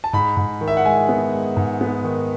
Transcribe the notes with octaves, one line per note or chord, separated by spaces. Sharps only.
A5
G#2 B5
G#2
D#3
E5
F#5
G#3 G#5
B3
G#3
G#2
B3
D#3